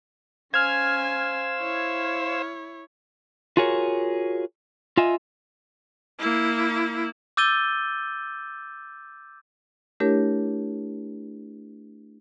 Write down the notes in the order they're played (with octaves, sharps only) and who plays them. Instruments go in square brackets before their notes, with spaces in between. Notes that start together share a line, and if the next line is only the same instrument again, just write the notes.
[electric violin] C#4 G#5 [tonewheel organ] C5 F5 E6 [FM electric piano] F6 G#6
[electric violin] E4 C#5
[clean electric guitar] F4 F#4 G#4 A#4 C#5
F4 D#5 E5 G#5
[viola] A#3 E4
[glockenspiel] D6 E6 G6 A6 D#7 G7
[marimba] A3 D4 E4 G4 A#4 C#5